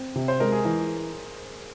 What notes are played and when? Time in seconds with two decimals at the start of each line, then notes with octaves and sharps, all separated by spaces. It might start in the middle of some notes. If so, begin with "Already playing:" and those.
Already playing: C4
0.15 C3
0.28 C5
0.40 G#3 A#4
0.52 G#4
0.65 E3 A#4